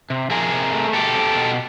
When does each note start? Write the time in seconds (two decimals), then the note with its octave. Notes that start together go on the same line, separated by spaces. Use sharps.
0.10 C3
0.30 F3 G#4 A#4
0.52 C3
0.73 A3
0.94 B2 G4 A4
1.15 C4
1.36 B2